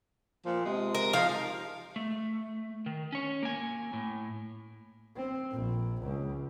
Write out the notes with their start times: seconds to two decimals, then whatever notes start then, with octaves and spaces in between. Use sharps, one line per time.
0.45 A#2 F3
0.64 C3 G#3
0.95 A#4
1.13 F3 D#4 F5
1.96 A3
2.86 D#3
3.12 C#4 C#5
3.43 A#3 G#5
3.93 A2
5.16 C4
5.51 A#1
6.03 C#2